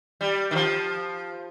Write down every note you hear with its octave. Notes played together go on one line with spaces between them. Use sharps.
G3
D#3
F3